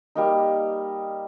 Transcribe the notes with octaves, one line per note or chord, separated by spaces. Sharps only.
G3 A#3 D#4